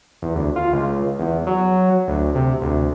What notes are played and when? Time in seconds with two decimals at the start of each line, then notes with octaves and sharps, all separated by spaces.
0.22 E2
0.35 D2
0.56 F4
0.73 C#2
1.19 E2
1.47 F#3
2.08 D2
2.35 C3
2.62 D2